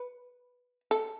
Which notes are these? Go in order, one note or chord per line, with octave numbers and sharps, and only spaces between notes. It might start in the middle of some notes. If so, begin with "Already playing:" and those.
Already playing: B4
A4